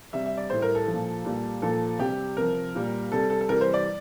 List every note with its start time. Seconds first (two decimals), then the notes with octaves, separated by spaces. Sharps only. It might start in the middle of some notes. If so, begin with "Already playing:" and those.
0.13 C3 G3 E5
0.26 E5
0.37 D5
0.50 A2 G3 C5
0.62 A#4
0.75 A4
0.87 F3
0.93 A#2
1.25 A#2 G3
1.62 A#2 F3 A4
1.99 C3 G3 G4
2.37 C3 F3 A#4
2.75 A#2 G3
3.12 C3 G3 A4
3.30 A4
3.41 A4
3.49 C3 E3 G3 A#4
3.61 C5
3.74 D5